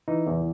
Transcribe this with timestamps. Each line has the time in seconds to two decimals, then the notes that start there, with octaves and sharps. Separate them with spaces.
0.08 E3 D#4
0.27 E2